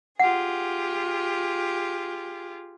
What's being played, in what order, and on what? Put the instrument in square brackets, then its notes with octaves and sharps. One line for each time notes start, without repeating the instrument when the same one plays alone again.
[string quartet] F4 G4 G#4 [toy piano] F#5